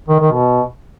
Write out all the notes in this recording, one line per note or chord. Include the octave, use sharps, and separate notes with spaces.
D#3
D#3
B2